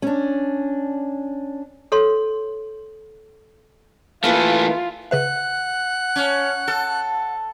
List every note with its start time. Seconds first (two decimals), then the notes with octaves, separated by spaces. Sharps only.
0.02 C#4 D4
1.92 A4 C#5 C6
4.24 E3 A3 A#3 E4 F4 B4
5.11 C#3 B4 E5 F#5 F#6
6.16 C#4
6.68 A4